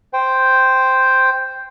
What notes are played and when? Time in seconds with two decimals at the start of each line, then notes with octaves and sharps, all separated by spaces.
0.13 C5 G5